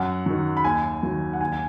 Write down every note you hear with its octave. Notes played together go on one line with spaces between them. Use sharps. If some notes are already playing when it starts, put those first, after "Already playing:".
Already playing: F#2 F#5
D#3 F#3
B5
D#2 G#5
D#3 F#3
F#5
D#2 G#5
G#5